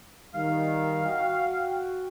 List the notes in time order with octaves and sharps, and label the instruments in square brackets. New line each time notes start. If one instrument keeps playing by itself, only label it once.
[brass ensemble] D#3 G3 [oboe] F5
[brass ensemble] F#4 G5